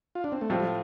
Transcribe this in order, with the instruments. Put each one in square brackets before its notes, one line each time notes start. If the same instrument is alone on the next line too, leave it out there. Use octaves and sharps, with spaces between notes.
[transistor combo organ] F4
D4
C4
A3
[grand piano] A2 F3 C4 F4 A4 [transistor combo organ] G3
[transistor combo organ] G3